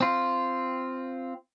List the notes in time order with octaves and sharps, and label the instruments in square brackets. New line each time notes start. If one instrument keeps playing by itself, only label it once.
[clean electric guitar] C4 F4